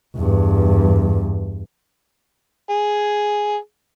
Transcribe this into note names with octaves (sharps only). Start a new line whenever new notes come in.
E2 G2
G#4